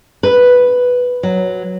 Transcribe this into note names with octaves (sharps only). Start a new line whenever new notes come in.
B4
F#3